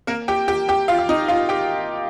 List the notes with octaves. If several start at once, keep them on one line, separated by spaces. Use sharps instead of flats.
A#3 A#4
G4 G5
G4 G5
G4 G5
F4 F5
F5
D#4 D#5
F4 F5
G4 G5